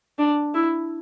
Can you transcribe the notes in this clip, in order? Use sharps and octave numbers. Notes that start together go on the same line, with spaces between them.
D4
E4